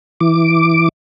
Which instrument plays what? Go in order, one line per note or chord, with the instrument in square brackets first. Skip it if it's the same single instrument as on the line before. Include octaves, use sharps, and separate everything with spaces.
[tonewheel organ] E3 D6